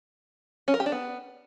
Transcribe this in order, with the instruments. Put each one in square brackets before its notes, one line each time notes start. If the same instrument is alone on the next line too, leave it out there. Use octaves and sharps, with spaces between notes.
[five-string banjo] C#4
A#4
G4
D4
B3